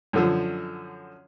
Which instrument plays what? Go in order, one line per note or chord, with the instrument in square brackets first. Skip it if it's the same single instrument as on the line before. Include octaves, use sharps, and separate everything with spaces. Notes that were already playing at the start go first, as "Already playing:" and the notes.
[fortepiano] F#2 D3 F3